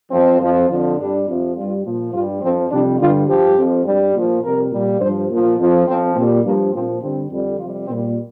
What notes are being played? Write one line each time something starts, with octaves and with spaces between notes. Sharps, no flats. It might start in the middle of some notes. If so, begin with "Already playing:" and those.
F2 F3 C4
F2 F3
F2 D3 F3
G2 G3 D4
F2 C3 F3
G2 G3 F4
A#2 F3
G2 G3 F4
F2 F3 C4
F2 C3 G3 D4
G2 D3 G3 F4
G2 F3 G4
F2 F3
G2 G3
A#2 F3
F2 C3 G3 A#4
A#2 G3
G2 F3 C5
A#2 F3
F2 F3
F2 F3 C4
A#2 G3 C4
G2 F3 A#3
A#2 F3 C4
G2 D3 G3 C4
F2 D3 G3
F2 C3 G3 F4
A#2 G3 C4